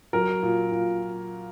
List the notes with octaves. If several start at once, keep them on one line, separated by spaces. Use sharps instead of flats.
F#3 A#4
A#2
A#2